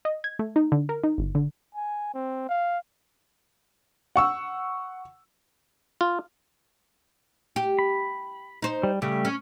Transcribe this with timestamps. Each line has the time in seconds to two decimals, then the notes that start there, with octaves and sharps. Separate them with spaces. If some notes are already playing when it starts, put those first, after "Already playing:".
0.05 D#5
0.24 G#6
0.39 A3
0.56 D#4
0.72 D3
0.89 A#4
1.04 D#4
1.18 G1
1.35 D3
1.75 G#5
2.14 C4
2.49 F5
4.16 F#5 C#6 E6
6.01 F4
7.56 G4
7.79 B5
8.62 D#4 C5
8.83 G3
9.02 C#3 G3 A3 G4
9.25 C#4